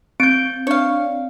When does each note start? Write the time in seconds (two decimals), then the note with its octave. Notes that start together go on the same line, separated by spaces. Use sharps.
0.20 C4 G6 D7
0.67 D4 C#5 F5